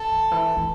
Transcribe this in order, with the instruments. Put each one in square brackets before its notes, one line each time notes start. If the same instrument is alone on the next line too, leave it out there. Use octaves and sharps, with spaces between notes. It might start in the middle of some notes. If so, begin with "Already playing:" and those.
Already playing: [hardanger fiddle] A4
[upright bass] D#3
E3
E3